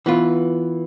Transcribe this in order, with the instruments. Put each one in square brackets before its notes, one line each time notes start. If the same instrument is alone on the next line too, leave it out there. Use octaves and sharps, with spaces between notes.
[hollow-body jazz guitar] E3 B3 F4